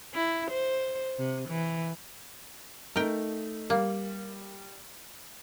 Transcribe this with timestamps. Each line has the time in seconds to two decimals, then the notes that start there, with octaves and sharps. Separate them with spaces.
0.14 E4
0.51 C5
1.19 C3
1.48 E3
2.96 A3 D#4 A#4 G5
3.70 G3 A#3